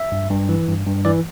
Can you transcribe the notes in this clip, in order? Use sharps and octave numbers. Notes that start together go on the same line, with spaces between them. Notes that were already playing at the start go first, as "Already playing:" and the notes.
Already playing: E5
G2
G2
E3
G2
G2
E3 D5